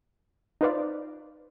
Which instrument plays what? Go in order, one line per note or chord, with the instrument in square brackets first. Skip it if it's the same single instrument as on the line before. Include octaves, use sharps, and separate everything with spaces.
[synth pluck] D#4 F4 B4 C5 D5 F5